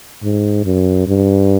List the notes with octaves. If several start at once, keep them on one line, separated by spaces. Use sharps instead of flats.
G#2
F#2
G2